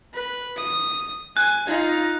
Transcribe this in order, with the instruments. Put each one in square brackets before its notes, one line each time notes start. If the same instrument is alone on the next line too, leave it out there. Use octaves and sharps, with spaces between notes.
[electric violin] B4
D#6
[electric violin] G#5 [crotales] F#6
[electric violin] D#4 F4